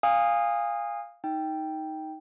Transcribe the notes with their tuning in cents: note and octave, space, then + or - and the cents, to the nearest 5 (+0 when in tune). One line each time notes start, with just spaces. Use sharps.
F5 +0 G#5 -30 D#6 +0
D#4 +10 G5 +0